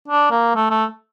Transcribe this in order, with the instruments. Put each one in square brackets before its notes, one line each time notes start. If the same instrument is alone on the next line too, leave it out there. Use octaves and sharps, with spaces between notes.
[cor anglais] D4
A#3
A3
A3